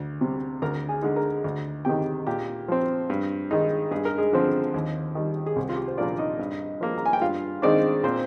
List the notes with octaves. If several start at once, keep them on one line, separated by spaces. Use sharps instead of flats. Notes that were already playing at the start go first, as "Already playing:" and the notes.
Already playing: D2
C3 G3
D2 A#4 A#5
G#4 G#5
D3 G#3 D#4
A#4 A#5
D2
C3 D#3 G4 G5
A#2 G4 G5
F3 C4
G2
D#3 G#3 D#4
G2 G#4
A#4
G#3 G#4
D3 F3 C4
D#2
D#3 G3
G#4
C2 G4
F4
G4
C5
A#2 F3 A#3 D4 D5
D#4 D#5
G2
F3 A#3
A#5
G#5
G5
G2 F4 F5
D#3 G#3 C4 D4 D#4 D5
A#2 C4 C5